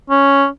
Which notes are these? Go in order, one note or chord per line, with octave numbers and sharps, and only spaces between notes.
C#4